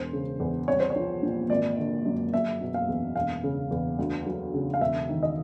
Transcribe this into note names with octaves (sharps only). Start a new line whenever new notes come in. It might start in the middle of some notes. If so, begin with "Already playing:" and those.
Already playing: E1 C5
C#3
E2
C2 C#5
C5
C#5
F3
A#2
G#1 D5
D3
F#2
F#1 E5
B2
F5
E2
E1 F5
C#3
E2
D2
F#3
C#3
F5
E1 E5
D#3
D#5